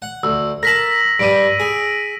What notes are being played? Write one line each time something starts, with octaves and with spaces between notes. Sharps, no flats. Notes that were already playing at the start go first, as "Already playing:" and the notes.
F#5
D2 E6
A#4 A5 A#6 B6 F#7
G2 G3 D7 D#7
G#4